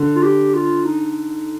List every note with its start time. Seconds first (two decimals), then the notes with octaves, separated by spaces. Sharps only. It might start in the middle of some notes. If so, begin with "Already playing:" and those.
Already playing: D3
0.15 F4
0.23 G4
0.55 F4
0.85 D#4